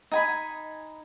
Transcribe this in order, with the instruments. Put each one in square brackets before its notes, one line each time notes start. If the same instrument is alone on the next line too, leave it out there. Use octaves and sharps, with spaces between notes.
[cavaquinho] D#4 G#5 B5